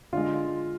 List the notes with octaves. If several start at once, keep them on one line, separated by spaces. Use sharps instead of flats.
D3 G#3 F4